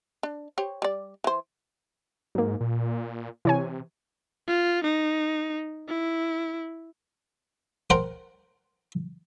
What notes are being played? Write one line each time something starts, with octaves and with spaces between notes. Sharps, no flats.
D4
G4 C5 C#5
G3 D5
E3 C5
G#2 F#3 A#3
A#2
C3 E3 C#5 G#5
F4
D#4
E4
A#4 C5 F#5 G5 A#5